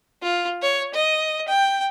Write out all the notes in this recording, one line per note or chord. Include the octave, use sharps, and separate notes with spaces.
F4
C#5
D#5
G5